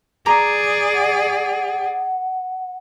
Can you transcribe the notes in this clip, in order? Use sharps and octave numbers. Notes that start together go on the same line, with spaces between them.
G#4 D5 A#5 D6
F#5